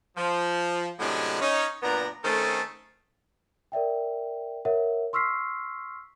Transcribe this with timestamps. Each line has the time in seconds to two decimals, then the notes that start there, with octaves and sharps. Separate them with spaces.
0.17 F3
0.99 A2 C3 F#3 G#3 C#4 D4
1.41 C#4 D#4
1.82 F#2 A#2 B3 D4 A#5
2.24 D#3 A3 C4 C#4 G#4 A4
3.72 A#4 D5 E5 G5
4.65 A#4 C#5 E5 F#5
5.13 C6 C#6 E6 F6 B6 C7